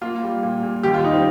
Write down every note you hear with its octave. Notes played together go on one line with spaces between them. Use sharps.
A#3 F4
G3
A#2
A#2
D#2 G4
F4
G3 D#4
C4